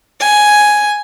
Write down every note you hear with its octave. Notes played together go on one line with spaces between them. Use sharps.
G#5